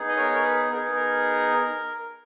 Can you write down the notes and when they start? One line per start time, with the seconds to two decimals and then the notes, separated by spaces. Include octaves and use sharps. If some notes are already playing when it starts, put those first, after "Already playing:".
Already playing: B3 D#4 G#4
0.09 D#5
0.17 A#4 C#5
0.33 A#4
0.44 B4
0.72 B3 D#4 G#4 A#4
0.95 A#4